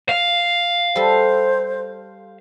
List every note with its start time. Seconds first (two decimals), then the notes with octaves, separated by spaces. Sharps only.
0.09 F5
0.96 G3 A4 C5